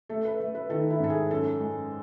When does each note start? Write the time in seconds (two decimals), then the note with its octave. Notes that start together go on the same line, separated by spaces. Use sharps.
0.09 A3 A4
0.25 B4
0.40 A3
0.55 B4
0.69 D#3 A4
0.90 E4
1.00 G#2 A4
1.10 G#4
1.30 F#2 A4
1.60 G#3